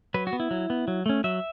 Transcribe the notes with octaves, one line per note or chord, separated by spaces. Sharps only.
F#3 B4
F#4
B3
E4
F#3
B3
F#3
A3 C#4
F#3 E5